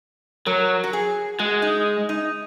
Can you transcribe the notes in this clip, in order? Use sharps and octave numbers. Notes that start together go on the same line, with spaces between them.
F#3 A#4
F#4
G#4
G#3 F#4
D#4
D#4